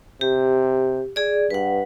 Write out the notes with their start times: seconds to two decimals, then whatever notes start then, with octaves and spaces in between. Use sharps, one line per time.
0.21 C3 G4
1.16 G#4 D5
1.50 G2 B4 F#5